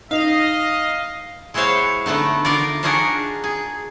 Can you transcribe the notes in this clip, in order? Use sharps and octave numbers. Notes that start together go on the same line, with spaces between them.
D#4 D#5 F5
G#3 E4 F#4 C5 C#5 F5
D3 A3 B3 D#4
D3 D#4 F4 A#4 D5
D4 D#4 F4 F#4 G#4 A#4
G#4